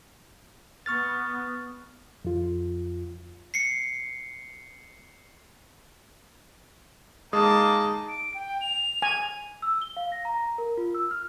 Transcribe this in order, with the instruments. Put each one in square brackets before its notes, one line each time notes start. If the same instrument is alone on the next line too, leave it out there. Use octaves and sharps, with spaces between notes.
[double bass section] B3 [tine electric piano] C#6 F6 A6
[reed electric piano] F2 F4
[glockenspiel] C7 C#7
[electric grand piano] G#3 [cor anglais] A#3 [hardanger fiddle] D#4 A5 [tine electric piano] D#6
[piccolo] D7
G5
F7
[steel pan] G#5
[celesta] E6
G7
F5
A#6
A#5
A#4
F4
E6
F6